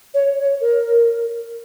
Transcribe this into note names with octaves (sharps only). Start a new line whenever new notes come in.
C#5
C#5
A#4